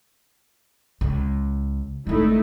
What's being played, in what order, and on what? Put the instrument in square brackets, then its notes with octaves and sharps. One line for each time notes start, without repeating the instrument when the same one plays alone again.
[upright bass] C#2
[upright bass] G#1 D3 [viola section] A3 D#4 E4